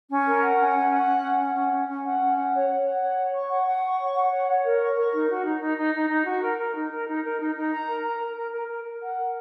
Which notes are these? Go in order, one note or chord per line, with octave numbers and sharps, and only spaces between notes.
C#4
A#4
F#5
C#4
F#5
F#5
C#4
C#4
F#5
C#4
C#4
C#4
F#5
C#4
F#5
C#5
C#5
F#5
C#5
C#5
C#6
F#5
F#5
C#6
C#5
F#5
C#5
C#5
A#4
C#6
A#4
D#4
F#4
D#4
D#4
D#4
D#4
D#4
F#4
A#4
A#4
D#4
A#4
D#4
A#4
D#4
D#4
A#5
A#4
A#5
A#4
A#4
A#4
A#4
A#4
F#5
A#4